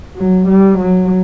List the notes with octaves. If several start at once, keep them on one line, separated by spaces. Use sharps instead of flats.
F#3
G3
F#3